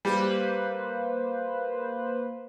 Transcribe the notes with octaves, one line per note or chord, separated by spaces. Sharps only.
G3 A#3 B4 C5